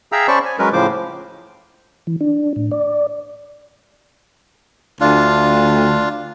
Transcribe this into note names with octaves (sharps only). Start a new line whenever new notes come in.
G#4 E5 F5 G5 A#5 E6
C#4 C5 D5 A5 B5 C#6
G#5
F#3 G#3 C#4 A#4 B4
A2 C#3 F3 C5 D6
E3
D4
A2
D5
D2 D4 F4